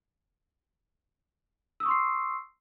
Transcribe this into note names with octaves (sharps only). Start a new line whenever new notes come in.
C6 C#6 D#6 E6 C7